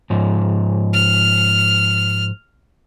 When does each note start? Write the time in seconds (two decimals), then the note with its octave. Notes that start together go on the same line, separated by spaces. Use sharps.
0.10 G#2 F3
0.93 F6